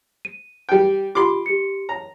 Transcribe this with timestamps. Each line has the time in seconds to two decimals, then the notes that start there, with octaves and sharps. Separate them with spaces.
0.25 D#7
0.69 G3 G5
1.15 F4 G4 B5 C6 D6
1.46 G4 C#7
1.89 C#5 A#5